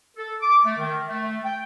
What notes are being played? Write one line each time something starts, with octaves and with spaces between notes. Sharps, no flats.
A4
D6
A3
D#3
A3
G5